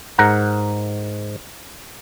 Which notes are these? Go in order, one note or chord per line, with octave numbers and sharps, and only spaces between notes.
G#2 A#4 F#5 A#5